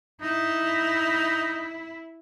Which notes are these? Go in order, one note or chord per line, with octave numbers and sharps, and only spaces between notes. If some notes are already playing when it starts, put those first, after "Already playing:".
D#4 E4